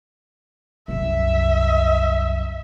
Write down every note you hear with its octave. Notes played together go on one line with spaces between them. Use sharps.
C2 F#2 E5